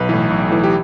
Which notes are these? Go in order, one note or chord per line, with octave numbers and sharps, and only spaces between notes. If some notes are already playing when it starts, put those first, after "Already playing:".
Already playing: B1 B4
A2 E3
B1
A2 E3
G4